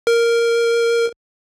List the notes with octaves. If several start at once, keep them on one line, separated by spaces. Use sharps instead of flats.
A#4